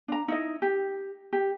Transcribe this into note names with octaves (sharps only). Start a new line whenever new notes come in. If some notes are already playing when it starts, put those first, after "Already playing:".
D4 A#5
D#4 E4 D#5
G4
G4